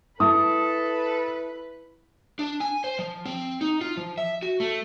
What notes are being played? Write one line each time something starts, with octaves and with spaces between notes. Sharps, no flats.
E4 A4 B4 D#6
D4
G#5
C5
F3
C4
D#4
F4
F3
E5
F#4
A3